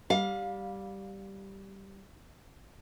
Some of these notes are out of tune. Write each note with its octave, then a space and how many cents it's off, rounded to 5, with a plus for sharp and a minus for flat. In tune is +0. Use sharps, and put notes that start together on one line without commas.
G3 -5 F5 +25